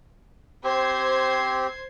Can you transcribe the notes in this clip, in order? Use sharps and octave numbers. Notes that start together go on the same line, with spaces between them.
C4 G4 C5 G#6 C7